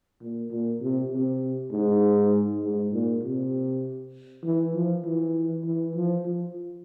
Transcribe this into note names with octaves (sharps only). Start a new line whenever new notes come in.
A#2
A#2
C3
C3
G#2
G#2
A#2
C3
E3
F3
E3
E3
F3
F3